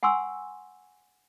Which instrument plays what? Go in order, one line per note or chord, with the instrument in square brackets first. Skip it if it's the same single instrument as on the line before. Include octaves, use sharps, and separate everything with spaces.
[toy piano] F#5 G#5 C6 C#6 E6